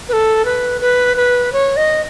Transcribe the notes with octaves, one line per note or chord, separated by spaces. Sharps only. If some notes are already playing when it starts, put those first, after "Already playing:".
B4
A4
B4
B4
B4
C#5
D#5